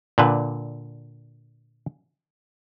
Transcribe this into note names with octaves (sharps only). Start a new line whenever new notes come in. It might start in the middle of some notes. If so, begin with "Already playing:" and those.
A#2 D3 B4